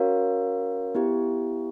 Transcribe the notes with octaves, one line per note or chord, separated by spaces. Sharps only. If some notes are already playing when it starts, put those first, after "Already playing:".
Already playing: C#4 F#4 A#4 C#5 F5
B3 E4 G4